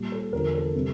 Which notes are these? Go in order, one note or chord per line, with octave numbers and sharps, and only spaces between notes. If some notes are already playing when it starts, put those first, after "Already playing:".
Already playing: A#2 G3
A4
E2 D3 F3 A#4
A4
C3 G3